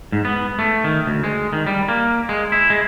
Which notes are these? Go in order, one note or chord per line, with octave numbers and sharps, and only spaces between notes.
G#2
B3
A3
D#3
D2
G#3
D#3
G3
A#3
G#3
E4
G#3